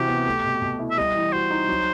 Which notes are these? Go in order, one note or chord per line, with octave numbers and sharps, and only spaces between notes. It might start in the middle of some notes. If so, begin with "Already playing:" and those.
Already playing: C3 E3 F#4 G4
B3
A3
B2
B2
E4
E5
G3 D#5
E3
F#4 C5
D#4
F#3